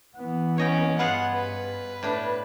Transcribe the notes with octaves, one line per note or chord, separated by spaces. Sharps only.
E3 B3
C#4 C#5 D#5 G5
G2 B3 F4 G#4 F#5
B4
A2 D4